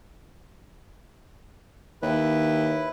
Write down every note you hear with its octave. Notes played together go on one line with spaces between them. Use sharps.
D#2 E4 B4